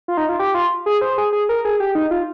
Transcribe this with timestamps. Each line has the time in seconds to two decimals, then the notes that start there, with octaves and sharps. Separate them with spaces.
0.08 F4
0.17 D#4
0.29 F4
0.39 G4
0.54 F4
0.86 G#4
1.01 C5
1.18 G#4
1.32 G#4
1.49 A#4
1.65 G#4
1.80 G4
1.95 D#4
2.11 F4